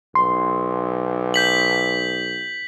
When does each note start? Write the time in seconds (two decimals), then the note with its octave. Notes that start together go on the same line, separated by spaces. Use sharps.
0.15 B1 C6
1.34 G6 B6 F#7